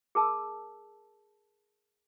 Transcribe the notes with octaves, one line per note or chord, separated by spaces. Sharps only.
G#4 A#4 A5 E6